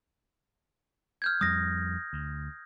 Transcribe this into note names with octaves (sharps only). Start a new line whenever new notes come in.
F6 G6 G#6
F2 G3 D#6 A#6
D2